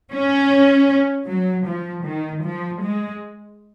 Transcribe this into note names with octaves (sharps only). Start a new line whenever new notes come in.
C#4
F#3
F3
D#3
F3
G#3